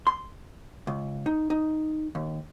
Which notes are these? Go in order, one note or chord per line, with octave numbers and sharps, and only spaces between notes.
C6
C#2
D#4
D#4
D#2